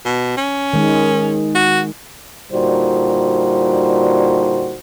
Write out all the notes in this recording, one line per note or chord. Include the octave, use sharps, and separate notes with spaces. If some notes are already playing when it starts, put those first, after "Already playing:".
B2
C#4
D#3 G#3
F#4
A#2 D3 G3 D#4 F#4 C5